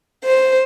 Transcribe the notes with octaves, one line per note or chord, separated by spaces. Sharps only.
C5